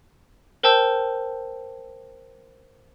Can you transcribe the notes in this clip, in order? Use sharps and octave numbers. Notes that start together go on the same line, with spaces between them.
A#4 C5 G5 A5 E6 G6